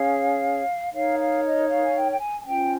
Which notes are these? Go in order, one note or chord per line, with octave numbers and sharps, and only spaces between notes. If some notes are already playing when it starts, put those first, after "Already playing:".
Already playing: C#4 G#4 C#5 F5
D#4 A#4 C#5 F5
F5
D#5
F5
G#5
G5
G5
G#5
G#5
C#4 F4 C5 G5